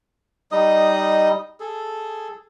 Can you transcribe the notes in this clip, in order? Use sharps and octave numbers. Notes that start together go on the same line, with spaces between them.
G3 D#4 D#5 D#6
G#4 A4